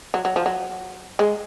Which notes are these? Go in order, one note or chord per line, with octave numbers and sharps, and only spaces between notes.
F#3
F#3
F3
F#3
G#3